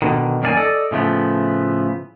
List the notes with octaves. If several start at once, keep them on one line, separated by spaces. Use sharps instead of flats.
B2 D3 D#3
F#2 D#3 A#3 D#4 D5 G#5
A4 D5 D#5
A2 C#3 F3 A3 B3